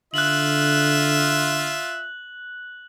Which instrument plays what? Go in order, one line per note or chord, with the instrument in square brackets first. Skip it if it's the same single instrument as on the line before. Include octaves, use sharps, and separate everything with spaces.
[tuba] D3 [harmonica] F4 E5 [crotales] F#6 F#7